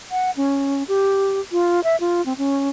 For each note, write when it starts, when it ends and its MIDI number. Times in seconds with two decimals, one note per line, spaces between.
0.11 0.31 78
0.37 0.83 61
0.88 1.40 67
1.52 1.80 65
1.84 1.96 76
2.00 2.24 65
2.26 2.33 60
2.38 2.70 61